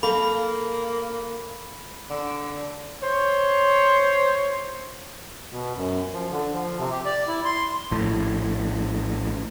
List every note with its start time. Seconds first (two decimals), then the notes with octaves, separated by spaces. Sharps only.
0.03 A#3 A4 F5 B5
2.10 D3
3.02 C5 C#5
5.51 B2
5.76 F#2
6.14 F3
6.31 D3
6.53 F3
6.78 C3
6.92 G4
7.06 D5
7.28 E4
7.45 C6
7.91 A#1 A2